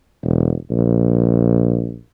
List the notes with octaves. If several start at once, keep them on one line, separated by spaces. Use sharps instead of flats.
E1
A#1